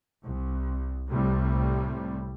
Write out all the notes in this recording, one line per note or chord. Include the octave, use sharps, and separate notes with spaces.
C2
C2 A2 C3 G3